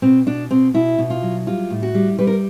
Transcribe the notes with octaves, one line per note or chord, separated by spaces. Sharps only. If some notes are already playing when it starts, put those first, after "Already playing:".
B2 C4
B2 D4
B2 C4
B2 E4
B2
F4
F#3
G3 F4
A2
F#4
G3
G3 B4
A#4